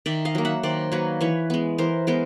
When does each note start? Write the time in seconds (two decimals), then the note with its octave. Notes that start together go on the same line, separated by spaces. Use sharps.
0.06 D#3 D5 E5
0.25 D#5 F5
0.35 F#3 A#3
0.45 E5 F#5
0.63 D#3 C5 D5
0.92 F#3 A#3 B4 C#5
1.21 E3 B4 C#5
1.50 G#3 B3
1.78 E3 A#4 C5
2.07 G#3 B3 A#4 C5